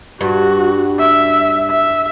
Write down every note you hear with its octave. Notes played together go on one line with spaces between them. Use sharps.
G2 F#4
E5
E5